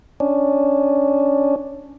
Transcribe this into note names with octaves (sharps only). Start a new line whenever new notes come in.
C#4 D4